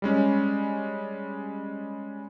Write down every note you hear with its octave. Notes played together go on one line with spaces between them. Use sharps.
G3 G#3 C#4